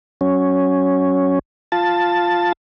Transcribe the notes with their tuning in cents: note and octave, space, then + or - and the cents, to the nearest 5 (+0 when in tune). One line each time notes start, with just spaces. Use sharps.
F#3 +10 C#4 +0
F4 +0 A5 +5